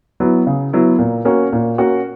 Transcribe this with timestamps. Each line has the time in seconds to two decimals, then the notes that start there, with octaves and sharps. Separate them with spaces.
0.20 F#3 B3 E4
0.47 C#3
0.73 F#3 B3 E4
0.98 A#2
1.25 A#3 C#4 F#4
1.52 A#2
1.78 A#3 C#4 F#4